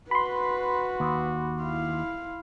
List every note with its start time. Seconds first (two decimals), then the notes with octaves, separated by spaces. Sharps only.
0.11 F#4 B4 B5 C6
1.00 D#2
1.63 E4 F5